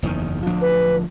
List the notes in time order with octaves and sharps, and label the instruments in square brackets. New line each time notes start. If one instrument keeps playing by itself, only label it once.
[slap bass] F#1 E2 D#3
D1 F3 D4
[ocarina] B4